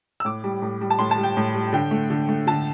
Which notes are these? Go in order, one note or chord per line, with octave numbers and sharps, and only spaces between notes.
E6
A2 D6
G3
A2
G3
A5
A2 C6
A5
G3
G5
A2
G3
D3 G5
A3
D3
A3
D3 A5